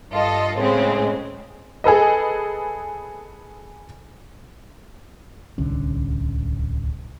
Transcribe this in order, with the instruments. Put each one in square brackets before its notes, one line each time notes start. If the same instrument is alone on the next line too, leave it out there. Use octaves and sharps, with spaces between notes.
[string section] G2 F4 A4 D#5
A2 C#3 G#3 C4
[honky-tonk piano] G#4 A4 B4 D#5
[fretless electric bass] D1 C2 D3 C#4